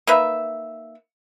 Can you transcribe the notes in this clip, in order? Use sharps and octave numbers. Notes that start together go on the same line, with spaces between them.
A#3 D#4 B4 E5